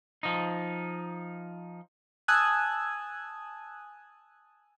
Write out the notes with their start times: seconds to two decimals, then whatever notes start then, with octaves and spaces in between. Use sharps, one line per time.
0.23 F3 D#4
2.28 G#5 A5 D#6 E6 F#6 G#6